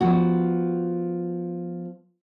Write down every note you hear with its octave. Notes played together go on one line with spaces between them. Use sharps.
F3 B3 F#4